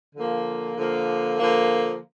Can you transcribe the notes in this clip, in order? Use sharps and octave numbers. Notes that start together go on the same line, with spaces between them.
D3 F3 A#3
D3 F3 A#3
D3 F3 A#3